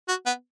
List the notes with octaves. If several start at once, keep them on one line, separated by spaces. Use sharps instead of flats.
F#4
B3